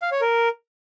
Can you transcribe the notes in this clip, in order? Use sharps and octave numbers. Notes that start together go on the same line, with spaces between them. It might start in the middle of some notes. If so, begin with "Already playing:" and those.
F5
C#5
A#4